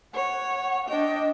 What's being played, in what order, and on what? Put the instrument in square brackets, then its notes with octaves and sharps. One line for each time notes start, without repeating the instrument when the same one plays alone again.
[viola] C#5 [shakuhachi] F#5
[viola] D4 G5 [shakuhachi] D#5